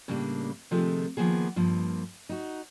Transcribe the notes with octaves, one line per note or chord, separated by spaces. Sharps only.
A2 C#3 G3 A#3 D4
C3 D#3 F3 G#3 A3 F4
D#3 F3 A#3 B3 G#4
G2 F3 A#3
D#4 F#4